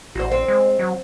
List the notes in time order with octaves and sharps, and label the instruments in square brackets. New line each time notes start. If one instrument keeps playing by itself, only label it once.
[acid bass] A1 [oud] F#4 C5
[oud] C4
[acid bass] G#3
F#3